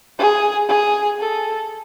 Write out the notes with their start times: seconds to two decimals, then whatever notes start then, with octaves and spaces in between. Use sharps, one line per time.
0.18 G#4
0.69 G#4
1.20 A4